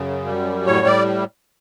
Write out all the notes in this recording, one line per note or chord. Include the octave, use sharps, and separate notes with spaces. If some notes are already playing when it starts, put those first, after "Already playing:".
Already playing: F#2 C#3
G3
A2 C#5
D5